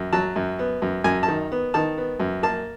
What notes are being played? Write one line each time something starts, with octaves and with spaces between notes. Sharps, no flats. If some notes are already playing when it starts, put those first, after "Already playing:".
Already playing: F#2
F#3 A5
F#2
B3
F#2
F#2 G#5
A5
D#3
B3
D#3 A5
B3
F#2
A#3 A5